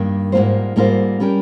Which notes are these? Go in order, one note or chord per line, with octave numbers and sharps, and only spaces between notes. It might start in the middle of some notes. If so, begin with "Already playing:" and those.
Already playing: G2 D#3 A#3
G#2 G3 A#3 F4 C5
G#2 G3 A#3 F4 C5
G3 C#4 G4 A#4